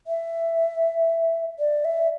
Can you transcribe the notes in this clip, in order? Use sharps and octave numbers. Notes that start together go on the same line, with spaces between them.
E5
D5
E5